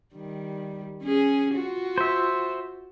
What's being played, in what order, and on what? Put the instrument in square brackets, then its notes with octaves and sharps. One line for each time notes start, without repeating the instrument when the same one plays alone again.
[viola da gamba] D#3 G3
C#4 G#4
F4 F#4
[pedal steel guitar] C5 E5